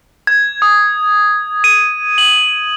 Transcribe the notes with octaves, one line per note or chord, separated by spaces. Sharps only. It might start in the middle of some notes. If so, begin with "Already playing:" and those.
G#6
D#6
D#7
F#7